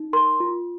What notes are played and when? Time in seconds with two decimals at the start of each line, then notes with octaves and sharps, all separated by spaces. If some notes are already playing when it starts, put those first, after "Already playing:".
Already playing: D#4
0.13 A#4 C6
0.40 F4